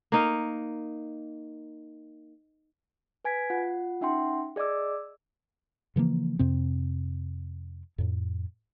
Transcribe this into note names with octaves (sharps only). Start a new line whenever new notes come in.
A#3 D#4 F5
B4 G#5 G#6 B6
F4 F#5
C#4 D#4 E5 F#5 G5 C6
G#4 D5 D#5 D6 E6
C#3 E3 F3 A#3
F2 C3 C4
F2 A2